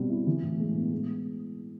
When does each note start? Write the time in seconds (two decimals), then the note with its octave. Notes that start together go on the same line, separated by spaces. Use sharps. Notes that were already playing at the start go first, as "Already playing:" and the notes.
Already playing: B2 G3 C4
0.10 E4
0.27 E3
0.43 A2
0.60 G#3
0.76 B3
0.92 G#3